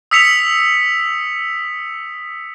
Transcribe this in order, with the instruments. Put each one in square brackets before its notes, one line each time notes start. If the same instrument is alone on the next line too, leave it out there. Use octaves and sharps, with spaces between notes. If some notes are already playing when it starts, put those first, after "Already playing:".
[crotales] D#6 E6 B6 C#7 F7